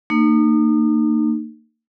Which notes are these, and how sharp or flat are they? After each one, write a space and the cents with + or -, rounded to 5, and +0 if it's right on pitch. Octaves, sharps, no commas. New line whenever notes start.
A#3 -30 D#4 -35